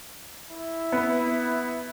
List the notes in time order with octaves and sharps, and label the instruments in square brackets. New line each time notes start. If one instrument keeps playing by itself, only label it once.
[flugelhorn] E4
[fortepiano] B3